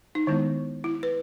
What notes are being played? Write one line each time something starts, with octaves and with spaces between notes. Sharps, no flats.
D#4
D#3 G#3 B3 E4
E4
B4